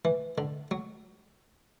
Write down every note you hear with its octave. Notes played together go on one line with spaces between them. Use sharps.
E3
D3
F#3